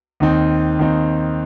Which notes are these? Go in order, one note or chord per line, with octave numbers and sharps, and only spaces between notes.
D#2 D#3 C4 D#4
D#2 D#3 C4 D#4